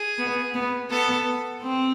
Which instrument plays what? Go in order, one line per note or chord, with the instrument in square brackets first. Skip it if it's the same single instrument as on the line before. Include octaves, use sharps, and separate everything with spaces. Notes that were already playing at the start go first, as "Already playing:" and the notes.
Already playing: [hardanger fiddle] G#4
[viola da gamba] B3
B3
[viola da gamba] B3 [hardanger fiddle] A4
[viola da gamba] C4